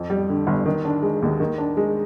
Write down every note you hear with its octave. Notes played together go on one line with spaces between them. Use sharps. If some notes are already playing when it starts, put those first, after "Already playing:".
Already playing: F2
G3
D3
G1
D#3
D4
G#3
D#2
D#3
D4
G#3